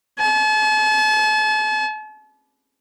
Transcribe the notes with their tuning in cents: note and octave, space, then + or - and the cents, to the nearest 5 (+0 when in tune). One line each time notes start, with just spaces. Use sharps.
A5 -40